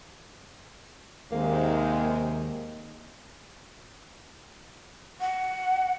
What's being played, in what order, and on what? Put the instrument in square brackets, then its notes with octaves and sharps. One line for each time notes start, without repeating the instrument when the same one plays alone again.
[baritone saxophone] D#2 [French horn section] C3 D#3 G#3 [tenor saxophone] A#3
[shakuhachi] F#5